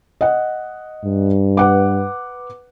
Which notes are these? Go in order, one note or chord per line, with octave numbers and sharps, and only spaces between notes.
D#5 F#5
G2
B4 F#5 D6